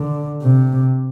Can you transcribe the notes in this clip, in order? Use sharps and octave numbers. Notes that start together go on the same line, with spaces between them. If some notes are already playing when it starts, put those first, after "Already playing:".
Already playing: D3
C3